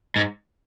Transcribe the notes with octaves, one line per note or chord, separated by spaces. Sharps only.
G#2